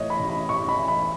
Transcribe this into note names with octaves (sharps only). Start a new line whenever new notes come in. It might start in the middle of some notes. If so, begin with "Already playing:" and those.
Already playing: A2 E3 C#5 D#5
B5
A1
B5
A1 C#6
B5
E3
B5